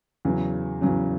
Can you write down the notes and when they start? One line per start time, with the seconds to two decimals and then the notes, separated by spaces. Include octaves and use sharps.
0.25 E2 C#3 F#3 C#4
0.81 E2 C#3 F#3 C#4